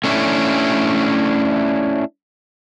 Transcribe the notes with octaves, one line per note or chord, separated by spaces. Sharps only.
A3 C#4 D4 E4